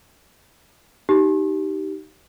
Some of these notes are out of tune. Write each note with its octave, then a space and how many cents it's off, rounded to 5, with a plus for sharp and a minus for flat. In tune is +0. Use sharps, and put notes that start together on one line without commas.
D#4 +0 G4 -20